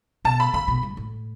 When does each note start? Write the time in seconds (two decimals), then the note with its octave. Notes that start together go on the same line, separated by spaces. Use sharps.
0.25 B2 A5
0.40 B5
0.53 D3 B5
0.68 B2
0.83 G2
0.97 A2